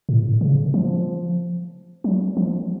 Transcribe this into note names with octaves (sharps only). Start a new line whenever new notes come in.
A2
C#3
F3
F#3
F3